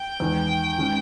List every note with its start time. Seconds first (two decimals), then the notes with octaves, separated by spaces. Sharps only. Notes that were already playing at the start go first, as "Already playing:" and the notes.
Already playing: G5
0.20 E2 D#3 G#3
0.78 D#3 G#3 C#4